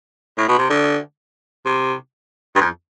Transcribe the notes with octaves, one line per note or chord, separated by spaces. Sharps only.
A2
B2
C3
D3
C3
G2
F2